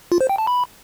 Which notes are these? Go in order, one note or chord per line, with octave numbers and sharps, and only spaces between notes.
F4
C5
G5
A5
B5